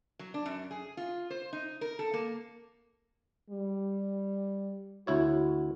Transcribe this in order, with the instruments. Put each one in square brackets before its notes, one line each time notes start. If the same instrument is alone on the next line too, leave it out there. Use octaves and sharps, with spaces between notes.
[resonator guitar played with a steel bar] F#3
D4
F#2
G#4
F4
C5
D#4
A#4
A4
A#3
[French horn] G3
[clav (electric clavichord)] D2 E4 C#5 [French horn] F#4